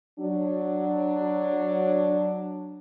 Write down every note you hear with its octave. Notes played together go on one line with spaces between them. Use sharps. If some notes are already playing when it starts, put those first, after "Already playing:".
F#3 D4